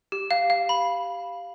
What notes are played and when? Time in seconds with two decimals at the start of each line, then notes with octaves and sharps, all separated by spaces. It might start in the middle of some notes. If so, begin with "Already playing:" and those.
0.12 G4
0.31 F5
0.50 F5
0.69 B5